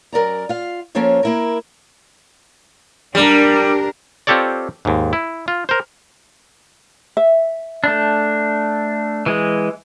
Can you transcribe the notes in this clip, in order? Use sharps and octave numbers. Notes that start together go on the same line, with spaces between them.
F#2 A#4 D5 A#5
F4 F5
F3 A#3 C#4 A4 C5 C#5
A#3 E4 A#4
G3 D4 A#4
C4 F4 G4 A4 C#5 D5
D#2 G#2
E4
F4
A#4 C5
E5
A3 D4
E3 G#3